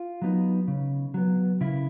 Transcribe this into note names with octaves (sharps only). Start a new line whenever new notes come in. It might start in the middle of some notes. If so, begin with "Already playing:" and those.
Already playing: F4
F#3 B3 D#4
C#3
F#3 B3
C#3 E4